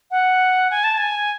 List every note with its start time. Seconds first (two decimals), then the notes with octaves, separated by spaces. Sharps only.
0.11 F#5
0.71 G#5
0.84 A5
0.98 G#5